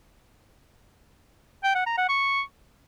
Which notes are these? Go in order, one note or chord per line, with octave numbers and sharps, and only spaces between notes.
G5
F#5
A#5
F#5
C#6